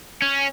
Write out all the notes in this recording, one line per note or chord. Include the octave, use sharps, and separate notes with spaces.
C#4